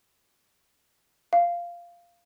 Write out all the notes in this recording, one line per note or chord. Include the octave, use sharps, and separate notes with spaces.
F5